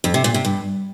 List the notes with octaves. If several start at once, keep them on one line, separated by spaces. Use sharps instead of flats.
F2
C3
A#2
C3
G2